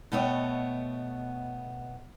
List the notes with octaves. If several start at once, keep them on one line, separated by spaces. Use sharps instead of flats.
B2 A3 B3 C#5 D#5 G5